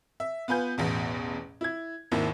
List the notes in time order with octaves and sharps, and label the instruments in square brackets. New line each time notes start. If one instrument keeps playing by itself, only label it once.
[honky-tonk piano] E5
B3 F4 B4 G#5 G6
A1 E2 B2
E4 G#6
G#1 D#2 D#3 E4